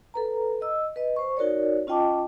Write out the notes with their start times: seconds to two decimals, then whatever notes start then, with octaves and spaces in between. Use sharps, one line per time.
0.14 A4 B4 A#5
0.61 D#5 E6
0.96 B4 D#5
1.16 C5 C#6
1.37 D#4 F#4 A#4 C#5 D5
1.87 C#4 F4 D#5 G5 A5 D6